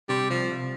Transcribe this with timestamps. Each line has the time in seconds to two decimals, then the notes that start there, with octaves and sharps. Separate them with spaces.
0.09 C3 G3
0.30 C2 F3
0.51 C2